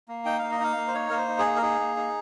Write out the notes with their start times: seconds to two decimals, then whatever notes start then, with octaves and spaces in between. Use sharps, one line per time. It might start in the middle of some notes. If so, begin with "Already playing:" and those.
0.08 A#3
0.25 D#4 G5
0.39 A#3 F5
0.51 D#5
0.60 D#4 F5
0.76 A#3
0.87 C5
0.94 D#4 C#5
1.10 A#3 A#4
1.17 C5
1.28 D#4
1.39 G#4
1.45 A#3
1.56 A#4
1.62 D#4 G#4
1.79 A#3
1.96 D#4